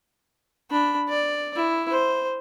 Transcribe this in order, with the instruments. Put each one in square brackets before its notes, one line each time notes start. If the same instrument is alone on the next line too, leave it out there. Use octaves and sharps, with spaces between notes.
[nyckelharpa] D4 B5
D5
E4
C5